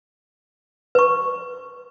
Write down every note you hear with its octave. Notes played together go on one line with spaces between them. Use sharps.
B4 C#6